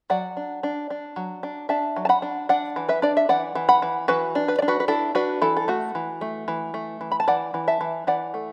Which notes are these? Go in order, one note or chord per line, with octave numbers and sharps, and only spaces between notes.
F#3 D5 F#5
D4
D4
D4
F#3
D4
D4 E5 A5
F#3
A5
F#5 B5
D4
D4 D5 F#5
E3
B4 E5
D4 D5
E5
E3 D5 F#5
E3
F#5 B5
E3
E3 F#4 B4
D4
B4
D5
D4
F#4 B4
B4
D4 E4 A4
D4 F#4 B4
E3 E4 A4
A4
A3 F#4
E3
A3
E3
A3
E3
B5
A5
E3 D5 F#5
E3
E5 A5
E3
E3 D5 F#5
A3